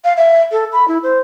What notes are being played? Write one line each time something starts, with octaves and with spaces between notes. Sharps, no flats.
F5
E5
A4
B5
E4
C5